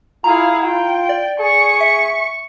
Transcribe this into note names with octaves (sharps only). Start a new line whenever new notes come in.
E4 F4 G#4 F5 A#5
F4 G5
D5
G#4 C#6
E5